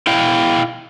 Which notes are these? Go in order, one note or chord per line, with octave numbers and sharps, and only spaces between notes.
E4 F5 G5